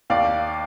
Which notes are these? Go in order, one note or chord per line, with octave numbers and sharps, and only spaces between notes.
D#2 D5 F5